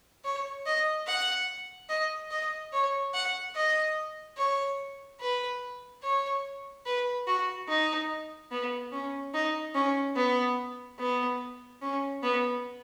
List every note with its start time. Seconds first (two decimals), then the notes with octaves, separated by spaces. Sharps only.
0.24 C#5
0.66 D#5
1.07 F#5
1.89 D#5
2.31 D#5
2.72 C#5
3.14 F#5
3.55 D#5
4.38 C#5
5.20 B4
6.03 C#5
6.86 B4
7.27 F#4
7.68 D#4
8.51 B3
8.92 C#4
9.34 D#4
9.75 C#4
10.16 B3
10.99 B3
11.82 C#4
12.23 B3